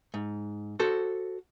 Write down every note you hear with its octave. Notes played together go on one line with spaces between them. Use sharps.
G#2
F#4 A4 C5